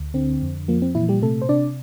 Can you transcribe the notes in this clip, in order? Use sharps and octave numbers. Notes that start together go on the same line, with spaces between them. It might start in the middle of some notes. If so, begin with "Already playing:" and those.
Already playing: D2
D3 C4
F2
F3 A#3
C4
A#2 E3 E4
G3 G4
C3 A3 A4
C5
C3 D4 D5